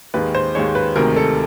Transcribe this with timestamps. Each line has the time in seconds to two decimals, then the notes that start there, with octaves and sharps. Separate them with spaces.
0.14 D#2 D#3 G#3 B4
0.35 C5
0.55 D#2 D#3 G#3 C#5
0.75 B4
0.95 D2 C3 D#3 G#3 A#4
1.16 A4